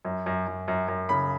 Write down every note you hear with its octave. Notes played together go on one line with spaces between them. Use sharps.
F#2
F#2
F#2
F#2
F#2
C#3 B5